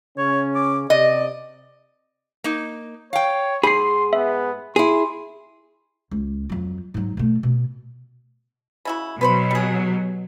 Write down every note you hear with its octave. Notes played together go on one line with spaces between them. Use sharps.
C#3 C#4 C#5
D6
C3 D5 D#5
A#3 D#4
C#5 F5 G5
G#2 G#4 B5 C6 C7
B3 E5
E4 G#4 C6
C#2
F2 F#3
G#2 F#3
B2 A3
B2
C#3 E4 F#4
B2 F#3 B4 C5 B5
G3 G#4